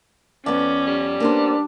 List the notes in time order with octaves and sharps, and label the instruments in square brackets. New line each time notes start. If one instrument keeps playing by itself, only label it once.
[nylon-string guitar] F2 B3 [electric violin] C#4 [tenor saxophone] D5
[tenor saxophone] G3
[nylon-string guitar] A#3 B3 C5 [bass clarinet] D4